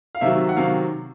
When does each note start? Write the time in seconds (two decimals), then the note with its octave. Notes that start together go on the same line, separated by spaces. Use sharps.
0.15 F5
0.21 C3 D#3 F#3 E5
0.49 F#5
0.56 C3 D#3 F#3 F5